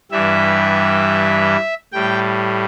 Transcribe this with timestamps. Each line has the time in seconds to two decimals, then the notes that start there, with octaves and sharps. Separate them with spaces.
0.11 G2 E3 G3 E5
1.92 A2 G3 G5